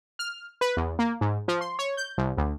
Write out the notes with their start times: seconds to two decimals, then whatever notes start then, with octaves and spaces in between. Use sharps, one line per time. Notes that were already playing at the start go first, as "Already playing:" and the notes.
0.19 F6
0.61 B4
0.77 E2
0.99 A#3
1.21 G#2
1.48 F3
1.61 C6
1.79 C#5
1.97 G6
2.18 C2
2.37 D2